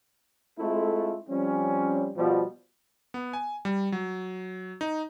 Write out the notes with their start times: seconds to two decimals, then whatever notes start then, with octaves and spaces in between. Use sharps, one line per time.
0.59 G#3 A3 C4 E4 F4 A4
1.30 F3 G3 C4 C#4
2.16 B2 F3 G3
3.14 B3
3.33 G#5
3.65 G3
3.92 F#3
4.81 D#4